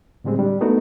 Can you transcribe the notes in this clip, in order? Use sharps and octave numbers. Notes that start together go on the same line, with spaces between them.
A2 D3 G3 G#3 C4
G3 D4
A3 B3 D#4 F#4 A4 A#4